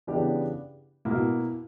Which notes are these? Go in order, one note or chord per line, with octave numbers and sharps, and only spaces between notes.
C#3 E3 B3 D4 G4
B2 A#3 E4